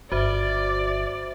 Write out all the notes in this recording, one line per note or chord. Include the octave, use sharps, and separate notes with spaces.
G1 F#4 C5 D5 E5